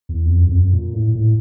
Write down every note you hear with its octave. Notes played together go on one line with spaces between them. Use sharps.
E2
F2
F#2
F2
F#2
A#2
A2
A2